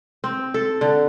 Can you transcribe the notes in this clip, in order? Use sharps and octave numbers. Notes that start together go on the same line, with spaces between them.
C4
A4
D3